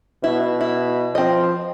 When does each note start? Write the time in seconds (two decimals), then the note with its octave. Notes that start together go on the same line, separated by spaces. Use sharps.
0.24 B2 E4
0.61 E4
1.15 F3 C4 D#5